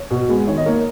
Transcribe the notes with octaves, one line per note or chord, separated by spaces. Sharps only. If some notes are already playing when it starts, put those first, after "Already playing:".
Already playing: C#5
B2
G#3 B3
D#3 C#5
D#5
A#3 C#5